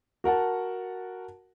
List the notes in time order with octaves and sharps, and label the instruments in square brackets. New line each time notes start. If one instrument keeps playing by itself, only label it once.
[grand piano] F#4 A#4 F#5 A5